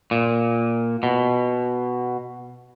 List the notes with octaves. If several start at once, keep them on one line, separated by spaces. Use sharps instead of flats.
A#2
B2